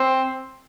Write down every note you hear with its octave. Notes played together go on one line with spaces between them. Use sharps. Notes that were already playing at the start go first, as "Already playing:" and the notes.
Already playing: C4